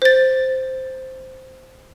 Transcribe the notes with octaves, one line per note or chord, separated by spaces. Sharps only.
C5 A6